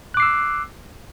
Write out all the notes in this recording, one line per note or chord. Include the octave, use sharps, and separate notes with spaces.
D6 E6 F#6 C7